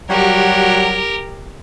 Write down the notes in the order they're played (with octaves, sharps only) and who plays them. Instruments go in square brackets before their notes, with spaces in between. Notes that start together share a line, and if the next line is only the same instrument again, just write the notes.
[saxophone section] F#3 G3 F#4 [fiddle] G4 A#4